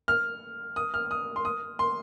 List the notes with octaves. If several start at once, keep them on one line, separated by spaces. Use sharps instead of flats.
F6
D#6
F6
D#6
C6
D#6
C6